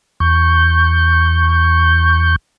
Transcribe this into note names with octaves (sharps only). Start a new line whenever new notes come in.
E2 C#6 G6